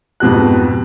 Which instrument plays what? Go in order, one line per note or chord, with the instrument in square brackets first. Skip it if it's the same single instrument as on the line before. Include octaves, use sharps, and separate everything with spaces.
[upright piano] F2 G#2 B2 G4 F#6